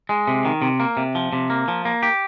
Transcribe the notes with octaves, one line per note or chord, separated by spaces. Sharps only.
G#3
C3
D#3
C3
A#3
C3
F3
C3
A#3
F3
A#3
G4